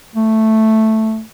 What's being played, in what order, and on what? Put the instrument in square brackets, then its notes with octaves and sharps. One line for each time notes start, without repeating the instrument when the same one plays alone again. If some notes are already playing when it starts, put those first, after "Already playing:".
[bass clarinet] A3